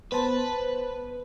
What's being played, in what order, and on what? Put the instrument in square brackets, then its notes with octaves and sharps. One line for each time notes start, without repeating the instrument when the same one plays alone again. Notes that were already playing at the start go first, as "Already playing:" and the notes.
[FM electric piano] B3 C5 A5 [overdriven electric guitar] B4